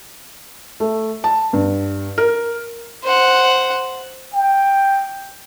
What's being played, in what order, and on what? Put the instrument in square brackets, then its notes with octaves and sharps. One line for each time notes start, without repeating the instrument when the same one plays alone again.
[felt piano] A3
A5
G2
A#4
[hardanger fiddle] C5 F#5
[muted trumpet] G5